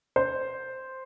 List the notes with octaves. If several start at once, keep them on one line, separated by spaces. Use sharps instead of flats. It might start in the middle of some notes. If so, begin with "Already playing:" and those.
C5